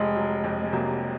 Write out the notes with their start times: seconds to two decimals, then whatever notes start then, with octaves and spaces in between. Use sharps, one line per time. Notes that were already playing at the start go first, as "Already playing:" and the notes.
Already playing: F1 G#3
0.16 F#3
0.44 F2
0.63 G#3
0.72 C3 F#3 A#3